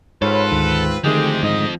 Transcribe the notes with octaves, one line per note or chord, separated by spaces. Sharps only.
G#2 C4 F4 A4 B4 C#5 B5 F6
D2 D#3
D3 D#3 F3 G#3 A3 C4 G4
G#2 D#5